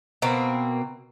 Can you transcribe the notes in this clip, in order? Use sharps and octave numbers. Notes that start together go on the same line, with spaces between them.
B2 A#3 C4